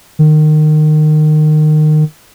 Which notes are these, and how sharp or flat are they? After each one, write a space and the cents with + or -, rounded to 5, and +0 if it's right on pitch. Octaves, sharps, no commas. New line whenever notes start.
D#3 -25